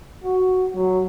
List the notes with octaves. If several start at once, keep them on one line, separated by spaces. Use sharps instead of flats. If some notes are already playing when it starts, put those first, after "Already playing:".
F#4
F#3